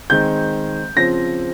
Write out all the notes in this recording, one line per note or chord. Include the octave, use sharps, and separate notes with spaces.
D#3 G#3 C4 G6
C#3 F3 C4 A#6